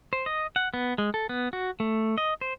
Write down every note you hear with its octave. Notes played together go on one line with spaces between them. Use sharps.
C5
D#5
F#5
B3
G#3
A4
B3
F#4
A3
D#5
C5